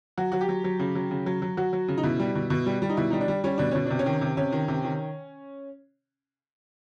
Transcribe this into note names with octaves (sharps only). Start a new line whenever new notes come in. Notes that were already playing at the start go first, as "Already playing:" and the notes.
F#3 F#4
F#3 F#4
G4
F#3
F#3
C#3
F#3
C#3
F#3
F#3
F#3 F#4
F#3
C#3
D#4
B2 E4
G3
B2
B2
G3
G3
D#4
B2 E4
G3 D#4
D4
G3
G3 C#4
B2 D4
B2 C#4
C3 D4
C#4
D#3
C3
C3 C#4
D#3
C3
D#3